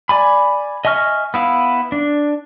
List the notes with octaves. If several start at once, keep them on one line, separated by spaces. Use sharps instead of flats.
D5 G#5 B5
D#5 E5 G#5 C#6 F6
B3 E4 F5
D4